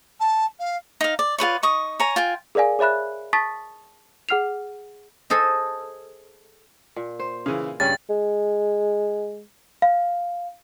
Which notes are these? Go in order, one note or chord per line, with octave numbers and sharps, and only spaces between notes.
A5
F5
D#4 F5
D5
F4 G#4 B4 C#5
D#4 C#6 D#6
C#5 G#5 A#5
F4 G5 G#5
G#4 A#4 D5 F5 G#5
G#4 C#5 E5 B5 F#6
A5 C#6 D#6 A6 B6
G#4 F#5 F6 C7 F7
G#4 A4 C5 D#5
A#2
C5
C#3 E3 F5
G2 C#3 G3 C#4 A6
G#3
F5